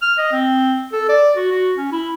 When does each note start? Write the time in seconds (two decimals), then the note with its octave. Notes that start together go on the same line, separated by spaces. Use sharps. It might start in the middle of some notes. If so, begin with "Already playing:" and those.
0.02 F6
0.18 D#5
0.32 C4
0.92 A4
1.09 D5
1.36 F#4
1.51 F#4
1.77 C#4
1.92 E4